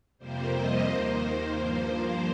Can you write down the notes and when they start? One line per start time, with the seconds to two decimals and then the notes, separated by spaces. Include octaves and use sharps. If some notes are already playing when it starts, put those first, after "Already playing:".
0.18 F2 C3 G3 A#3 C5
0.52 D#5
0.85 D#2 D#3 A#3 C5
1.52 G2 F3 A#3